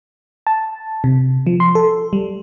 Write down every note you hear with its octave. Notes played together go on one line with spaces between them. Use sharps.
A5
C3
F3
C6
A4
G3